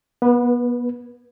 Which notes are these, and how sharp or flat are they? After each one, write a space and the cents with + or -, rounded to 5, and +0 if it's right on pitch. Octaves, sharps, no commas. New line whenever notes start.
B3 -30 B4 +0